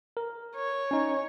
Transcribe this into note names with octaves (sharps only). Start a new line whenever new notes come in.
A#4
C#5
C#4 D#4